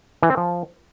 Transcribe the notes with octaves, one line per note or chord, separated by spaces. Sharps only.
E3
C4
F3